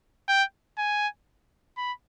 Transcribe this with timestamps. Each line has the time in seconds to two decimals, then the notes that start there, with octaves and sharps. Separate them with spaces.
0.28 G5
0.78 G#5
1.77 B5